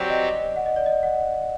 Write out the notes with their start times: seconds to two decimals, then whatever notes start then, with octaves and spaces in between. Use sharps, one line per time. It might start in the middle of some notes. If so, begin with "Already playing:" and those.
Already playing: F#3 C4 G4 D5
0.10 D#5
0.56 F#5
0.66 D#5
0.76 D5
0.86 D#5
1.03 F#5